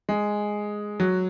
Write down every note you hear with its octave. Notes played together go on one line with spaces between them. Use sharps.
G#3
F#3